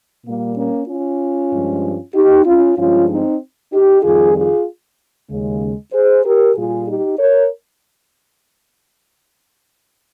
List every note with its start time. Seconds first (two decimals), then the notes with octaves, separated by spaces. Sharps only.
0.24 A#2 G3 A#3
0.56 A#3 C#4
0.87 C#4 F4
1.51 G2 F3 G#3
2.14 D#4 G4
2.45 C#4 F4
2.77 G2 F3 G#3 C#4 F4
3.09 C4 D#4
3.71 D#4 G4
4.03 F2 D#3 G3 F4 G#4
4.35 F4 G#4
5.29 D#2 C#3 G#3
5.92 G#4 C5
6.24 G4 A#4
6.55 A#2 G3 F4 G#4
6.87 D#4 G4
7.18 A#4 C#5